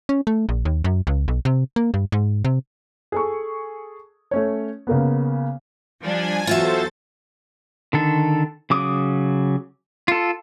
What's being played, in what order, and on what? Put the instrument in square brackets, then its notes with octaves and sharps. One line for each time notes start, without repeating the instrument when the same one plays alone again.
[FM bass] C#4
A3
A#1
D#2
F#2
C#2
B1
C3
A#3
G2
G#2
C3
[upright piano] G#4 A4 C#6
A3 C#4 C#5
C#3 A#3 B3
[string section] F3 G3 D4 [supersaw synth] G#5
[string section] E2 F#3 A6 [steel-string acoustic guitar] F4 F#4 E5 [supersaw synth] A4 C5
[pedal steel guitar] D3 D#3 A4
C#3 F#3 D6 D#6
F4 A4